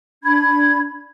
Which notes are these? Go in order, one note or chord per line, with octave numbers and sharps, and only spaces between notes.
D4 B5 G#6